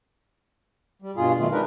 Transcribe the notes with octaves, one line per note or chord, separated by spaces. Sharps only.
G3
G2 B2 F4 G#4
F#2 B2 D#3 A3 F4
G#3 D4 D#4 A#4 B4